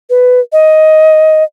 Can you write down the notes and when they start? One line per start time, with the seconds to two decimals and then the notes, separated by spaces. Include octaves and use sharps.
0.10 B4
0.52 D#5